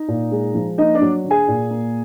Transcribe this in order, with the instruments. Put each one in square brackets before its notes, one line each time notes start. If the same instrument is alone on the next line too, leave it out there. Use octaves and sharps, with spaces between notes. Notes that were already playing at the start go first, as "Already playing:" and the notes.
Already playing: [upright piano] D#4
A#2
G#3
F3
A#3 D#4 D#5
D4 D5
F#3
D3
G#4 G#5
A#2
A#3